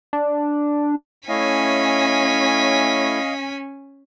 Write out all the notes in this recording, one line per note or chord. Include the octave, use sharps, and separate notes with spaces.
D4
A3 C#4 E4 C#5 D#5 F5 G#5 B6